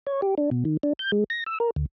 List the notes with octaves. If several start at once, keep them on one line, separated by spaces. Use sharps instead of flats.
C#5
G4
D4
B2
D#3
D4
G6
G#3
A#6
E6
A#4
D2